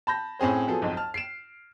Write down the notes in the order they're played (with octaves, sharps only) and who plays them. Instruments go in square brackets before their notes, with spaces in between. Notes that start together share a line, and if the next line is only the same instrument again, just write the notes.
[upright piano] A5 B5 G6 A#6
A2 C4 C#4 G#4 C5
F3 F#3 B3 G#4 A4
B1 F2 G#2
A5 F6
C7 D7 E7